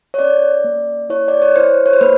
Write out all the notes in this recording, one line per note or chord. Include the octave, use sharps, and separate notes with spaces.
C#5
C#4 D5
A#3
E4 C#5
D5
C#5
E4 C5
C#5
C5
A#3 B4